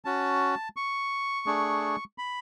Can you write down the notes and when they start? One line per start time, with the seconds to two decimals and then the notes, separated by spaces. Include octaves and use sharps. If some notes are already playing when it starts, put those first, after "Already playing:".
0.05 C#4 F#4 A5
0.76 C#6
1.46 A3 D4 G#4
2.18 B5